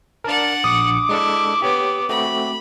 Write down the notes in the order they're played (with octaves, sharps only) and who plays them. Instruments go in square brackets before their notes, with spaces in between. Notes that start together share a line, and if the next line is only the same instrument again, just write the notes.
[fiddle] D4 F#5 [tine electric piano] A#4 D5 [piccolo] A5
[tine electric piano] A#1 C#7 [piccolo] D6 [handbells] D#6
[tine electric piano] G#3 D4 A4 [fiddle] E4
[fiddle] B3 [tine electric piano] G4 C#5
[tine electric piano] A3 C4 F#4 [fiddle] B5